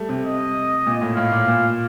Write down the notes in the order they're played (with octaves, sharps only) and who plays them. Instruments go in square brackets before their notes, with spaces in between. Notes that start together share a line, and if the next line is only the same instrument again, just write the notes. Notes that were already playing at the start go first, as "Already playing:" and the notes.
Already playing: [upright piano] G3 A3
C3
[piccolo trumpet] D#5
[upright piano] A#2
A2
[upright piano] A2 [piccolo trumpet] F5
[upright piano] A#2
A#2